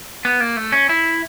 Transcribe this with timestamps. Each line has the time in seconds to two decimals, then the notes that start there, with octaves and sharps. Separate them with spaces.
0.25 B3
0.40 A#3
0.57 A3
0.72 C#4
0.89 E4